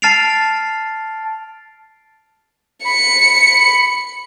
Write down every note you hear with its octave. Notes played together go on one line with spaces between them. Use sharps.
A5 F6 A6 C7 D7 F7
B5 C#7